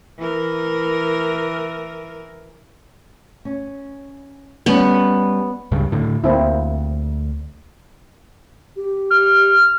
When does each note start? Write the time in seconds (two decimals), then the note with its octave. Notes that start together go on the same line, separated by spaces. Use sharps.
0.19 E3 A#4
3.45 C#4
4.66 G3 B3 C#4
5.71 C#2 G2 C#3
5.92 A2 D3
6.24 D2 A#3 C4 E4
8.77 G4
9.10 F6